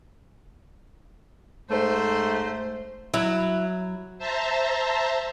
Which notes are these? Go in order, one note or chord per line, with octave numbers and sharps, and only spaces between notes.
G#2 A3 C5
F#3 E4
C5 E5 A5 A#5